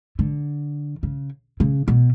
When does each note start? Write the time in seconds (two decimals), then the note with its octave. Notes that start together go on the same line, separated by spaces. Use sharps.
0.19 D3
1.03 C#3
1.60 C#3
1.88 B2